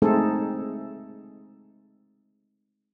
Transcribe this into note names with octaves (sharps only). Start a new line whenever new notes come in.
G#3 A3 C4 D#4 G#4 A4